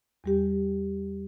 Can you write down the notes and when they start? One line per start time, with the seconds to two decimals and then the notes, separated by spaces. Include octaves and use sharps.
0.24 E2 G3 G4